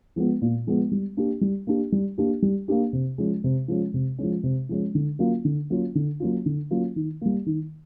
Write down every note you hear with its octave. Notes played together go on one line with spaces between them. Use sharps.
F3 G#3 B3
A#2
F3 G#3 B3
G3
A#3 D4 G4
G3
A#3 D4 G4
G3
A#3 D4 G4
G3
A#3 D4 G4
C3
F3 G#3 C#4
C3
F3 G#3 C#4
C3
F3 G#3 C#4
C3
F3 G#3 C#4
D3
F#3 A#3 C#4 F4
D3
F#3 A#3 C#4 F4
D3
F#3 A#3 C#4 F4
D3
F#3 A#3 C#4 F4
D#3
G3 A#3
D#3